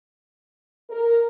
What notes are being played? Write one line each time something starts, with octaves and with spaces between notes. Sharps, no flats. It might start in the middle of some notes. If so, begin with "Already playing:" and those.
A#4